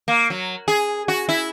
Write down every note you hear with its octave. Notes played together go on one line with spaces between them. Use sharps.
A#3
F#3
G#4
F#4
E4